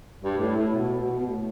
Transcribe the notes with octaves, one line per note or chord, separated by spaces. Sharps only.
G2
A2
A2
B2
B2
B2
A2